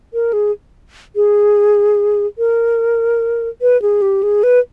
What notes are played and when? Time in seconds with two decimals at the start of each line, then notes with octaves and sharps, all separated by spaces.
0.13 A#4
0.33 G#4
1.16 G#4
2.38 A#4
3.62 B4
3.82 G#4
4.02 G4
4.23 G#4
4.43 B4